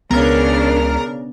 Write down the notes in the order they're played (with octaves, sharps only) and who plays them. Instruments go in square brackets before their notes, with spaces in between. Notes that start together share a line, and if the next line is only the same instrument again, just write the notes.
[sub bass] C#2 [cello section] C#3 D4 [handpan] B3 [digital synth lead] A#4